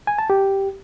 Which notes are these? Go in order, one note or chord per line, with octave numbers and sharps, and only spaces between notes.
G#5
A5
G4